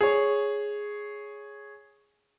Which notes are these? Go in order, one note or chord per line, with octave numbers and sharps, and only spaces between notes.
G#4 C#5